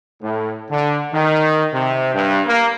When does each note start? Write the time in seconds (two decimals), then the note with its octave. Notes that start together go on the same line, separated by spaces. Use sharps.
0.22 A2
0.70 D3
1.13 D#3
1.73 C3
2.14 G2
2.47 A#3